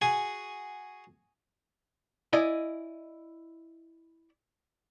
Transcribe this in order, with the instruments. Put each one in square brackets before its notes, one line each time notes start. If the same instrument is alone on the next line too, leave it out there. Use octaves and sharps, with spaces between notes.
[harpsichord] F#4 G#4 G#5
[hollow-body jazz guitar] E4 D5 D#5 G#5